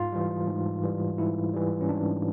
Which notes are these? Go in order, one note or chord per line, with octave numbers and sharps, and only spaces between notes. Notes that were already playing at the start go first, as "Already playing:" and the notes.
Already playing: G#2 F4
E3 G3
G#2
E3 G3
G#2 E4
E3 G3
C#4
G#2 D4